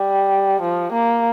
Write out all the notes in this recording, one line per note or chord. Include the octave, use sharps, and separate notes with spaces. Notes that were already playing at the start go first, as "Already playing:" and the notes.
Already playing: G3
F3
A#3